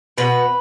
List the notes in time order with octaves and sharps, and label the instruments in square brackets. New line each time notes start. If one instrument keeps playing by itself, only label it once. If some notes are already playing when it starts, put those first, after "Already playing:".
[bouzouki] B2 B4